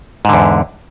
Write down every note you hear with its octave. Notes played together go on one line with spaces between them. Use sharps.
E2 G#2 D3